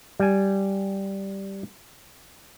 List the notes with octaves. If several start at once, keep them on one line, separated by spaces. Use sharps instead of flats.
G3 G#5